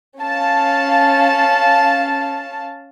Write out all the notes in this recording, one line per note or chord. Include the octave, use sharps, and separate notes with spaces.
C#4 F5 A5